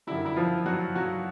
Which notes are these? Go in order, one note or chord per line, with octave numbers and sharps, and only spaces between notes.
F#2 D3 G3 E4
E4
F3 F4
F#3 F#4
F#3 F#4